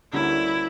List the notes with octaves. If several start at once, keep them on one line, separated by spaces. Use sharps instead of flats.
D2 D3 G3 A#3 C#4 E4